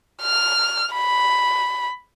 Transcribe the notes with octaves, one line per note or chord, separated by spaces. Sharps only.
F6
B5